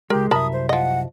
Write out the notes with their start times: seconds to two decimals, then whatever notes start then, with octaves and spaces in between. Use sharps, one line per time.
0.10 C#2 G#3 G4 A#4
0.31 C2 F#2 A#4 E5 A5 B5 D#6
0.53 C5
0.69 F3 D#5 F#5